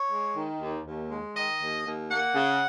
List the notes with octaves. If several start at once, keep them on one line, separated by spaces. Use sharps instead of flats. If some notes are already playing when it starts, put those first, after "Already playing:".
Already playing: C#5
G#3
D#3
D#2
D#2
G#3
D#3 D#5
D#2
D#2
A#3 F#5
C#3